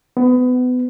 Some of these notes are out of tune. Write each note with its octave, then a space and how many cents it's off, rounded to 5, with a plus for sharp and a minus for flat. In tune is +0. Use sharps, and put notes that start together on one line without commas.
B3 +25